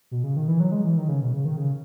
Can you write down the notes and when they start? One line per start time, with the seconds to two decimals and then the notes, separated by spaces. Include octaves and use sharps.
0.11 B2
0.24 C#3
0.36 D#3
0.48 E3
0.60 F#3
0.72 G#3
0.84 E3
0.97 D#3
1.08 C#3
1.21 B2
1.33 C#3
1.45 D#3
1.57 C#3